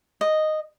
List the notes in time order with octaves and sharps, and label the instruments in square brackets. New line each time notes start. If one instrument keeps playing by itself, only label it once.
[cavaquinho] D#5